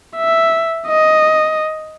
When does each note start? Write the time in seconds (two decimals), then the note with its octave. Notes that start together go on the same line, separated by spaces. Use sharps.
0.17 E5
0.87 D#5